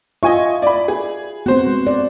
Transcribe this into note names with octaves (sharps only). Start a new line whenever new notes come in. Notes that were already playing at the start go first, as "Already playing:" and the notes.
F4 D#5 E5 G#5 C#6
D5 B5
G#4
B3 C4 F#4 C5
G#3
D5